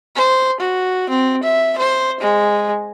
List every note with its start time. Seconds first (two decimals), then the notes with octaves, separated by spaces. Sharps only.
0.16 C5
0.60 F#4
1.10 C4
1.43 E5
1.78 C5
2.20 G#3